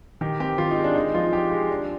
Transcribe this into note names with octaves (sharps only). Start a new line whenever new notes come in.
D#3 G4
C4 G4
D#3 F4
D#4
G#3
D4
G#3 D#4
F3 F4
F3 G4
G#3
D4